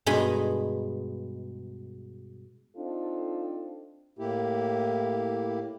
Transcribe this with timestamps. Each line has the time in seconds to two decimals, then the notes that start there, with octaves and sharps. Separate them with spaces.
0.06 G2 B2 G#3 D#4 G#5 B5
2.77 C4 D4 D#4 F4 A4
4.19 A2 A#3 E4 G4